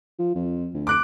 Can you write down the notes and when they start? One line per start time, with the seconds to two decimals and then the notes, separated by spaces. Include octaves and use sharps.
0.19 F3
0.35 F2
0.74 D2
0.87 D6 F#6 D7